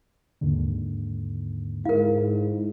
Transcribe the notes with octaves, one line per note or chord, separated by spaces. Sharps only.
D#2 G#2 D3
G#2 E4 A#4 F5